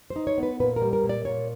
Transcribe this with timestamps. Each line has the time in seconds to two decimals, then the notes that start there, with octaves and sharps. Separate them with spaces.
0.10 C5
0.16 D#4
0.27 C#5
0.38 B3 B4
0.60 A#2 B4
0.76 A#4
0.82 G3
0.93 A#4
1.03 A#2
1.09 D5
1.25 A#2 C#5